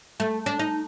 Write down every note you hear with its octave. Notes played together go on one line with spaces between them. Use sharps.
A3
D4
D#4